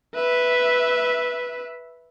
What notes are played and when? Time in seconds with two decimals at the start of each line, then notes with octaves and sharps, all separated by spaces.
0.15 B4 E5